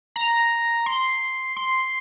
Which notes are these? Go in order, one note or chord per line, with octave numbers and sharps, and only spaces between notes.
A#5
C6
C6